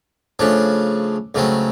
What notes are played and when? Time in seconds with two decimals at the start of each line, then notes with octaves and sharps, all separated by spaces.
0.39 C#3 F3 A3 D4
1.35 C#2 C#3 F#3 A3 C4